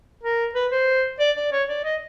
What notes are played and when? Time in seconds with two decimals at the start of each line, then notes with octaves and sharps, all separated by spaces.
0.23 A#4
0.55 B4
0.71 C5
1.20 D5
1.36 D5
1.52 C#5
1.69 D5
1.84 D#5